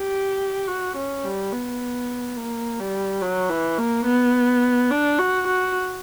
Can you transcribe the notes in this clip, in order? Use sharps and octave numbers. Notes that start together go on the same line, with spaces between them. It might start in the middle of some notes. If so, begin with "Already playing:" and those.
Already playing: G4
F#4
C#4
G3
B3
A#3
G3
F#3
E3
A#3
B3
D4
F#4
F#4